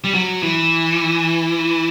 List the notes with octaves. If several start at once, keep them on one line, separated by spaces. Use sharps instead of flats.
G3
F#3
E3